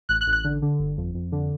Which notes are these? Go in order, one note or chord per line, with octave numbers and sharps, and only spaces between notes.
A1 F#6
F#6
A1
F#6
D3
D3
G1
F2
F2
D3